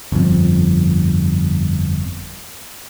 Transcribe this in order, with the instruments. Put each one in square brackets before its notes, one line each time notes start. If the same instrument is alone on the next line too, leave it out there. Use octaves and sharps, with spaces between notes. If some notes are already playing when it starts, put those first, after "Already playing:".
[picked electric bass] G1 F2